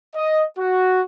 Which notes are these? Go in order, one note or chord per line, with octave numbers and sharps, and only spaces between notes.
D#5
F#4